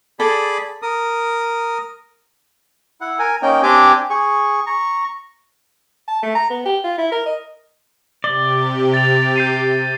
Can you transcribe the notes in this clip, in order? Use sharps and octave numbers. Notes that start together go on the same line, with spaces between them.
G#4 A4 D5 B5
A#4 D#6
E4 F#5
A#4 G#5
A#3 C#4 D#4 A#4 G5
C4 D4 G4 G#5 D6
G#4 C#6
A#5 C#6
A5
A3
A#5
B3
G4
F4
E4
A#4
D#5
C3 G4 D5 G7
A6 F7
G6 C7 D#7